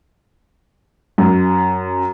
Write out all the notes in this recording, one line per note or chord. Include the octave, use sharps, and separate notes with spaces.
F#2